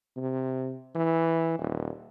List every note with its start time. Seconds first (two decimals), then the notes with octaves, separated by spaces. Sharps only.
0.17 C3
0.95 E3
1.59 D#1